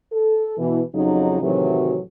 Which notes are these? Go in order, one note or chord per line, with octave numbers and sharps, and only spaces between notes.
A4
B2 E3
F2 C#3 F#3 D#4
A2 C3 D#3 E3 F#3